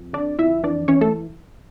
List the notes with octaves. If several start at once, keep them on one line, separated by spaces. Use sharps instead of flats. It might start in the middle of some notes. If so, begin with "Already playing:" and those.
Already playing: F2
D3 D4 D5
F2 E4 E5
E3 D4 D5
E3 C#4 C#5
A3 A4